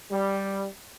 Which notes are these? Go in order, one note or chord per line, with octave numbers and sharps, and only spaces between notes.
G3